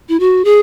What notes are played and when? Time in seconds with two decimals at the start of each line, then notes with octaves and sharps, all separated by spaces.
0.09 E4
0.20 F#4
0.45 G#4